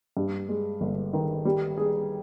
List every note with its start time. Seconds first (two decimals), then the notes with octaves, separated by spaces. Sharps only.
0.17 G2
0.49 G#3
0.81 G1
1.13 D#3
1.45 G3
1.78 G#4